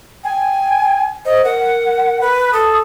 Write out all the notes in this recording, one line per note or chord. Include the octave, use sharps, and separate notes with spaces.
G5 G#5
C5 D#5
A#4 F#5
B4
A4 D#6